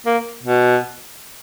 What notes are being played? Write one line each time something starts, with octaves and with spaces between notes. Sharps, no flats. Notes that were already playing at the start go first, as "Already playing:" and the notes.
A#3
B2